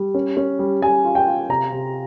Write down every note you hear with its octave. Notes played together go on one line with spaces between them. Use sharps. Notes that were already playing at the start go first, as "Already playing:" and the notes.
Already playing: G3
C#4
C#4
G3
G3 G#5
F4
G5
F4
C3 A#5
C3